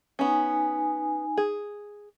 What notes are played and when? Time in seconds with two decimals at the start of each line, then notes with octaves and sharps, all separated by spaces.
0.19 B3 C#4 D#4 G#5
1.37 G#4